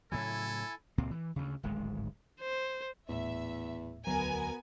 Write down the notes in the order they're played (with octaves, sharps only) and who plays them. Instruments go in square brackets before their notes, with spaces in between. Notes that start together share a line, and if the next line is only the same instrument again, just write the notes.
[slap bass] A2 C#3 F#3 [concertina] E4 G#5 [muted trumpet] A4
[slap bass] C#2 A#2 C4
E3
D2 C#3
D1 G#1 G#2 G#3
[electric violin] C5
[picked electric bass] D#1 A2 [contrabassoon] E2 [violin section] E5
[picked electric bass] E1 D2 F#3 [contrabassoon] B2 [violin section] B3 A#4 G#5